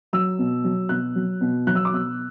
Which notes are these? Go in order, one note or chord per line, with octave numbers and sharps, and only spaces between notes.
F#3 E6
B2
F#3
B2 F#6
F#3
B2
F#3 F#6
E6
D6
B2 E6